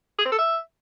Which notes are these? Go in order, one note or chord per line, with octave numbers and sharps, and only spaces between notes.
G#4
C4
A4
E5